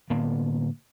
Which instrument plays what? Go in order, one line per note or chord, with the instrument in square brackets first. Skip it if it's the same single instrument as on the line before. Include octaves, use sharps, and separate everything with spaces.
[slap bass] A2 D3 A#3 B3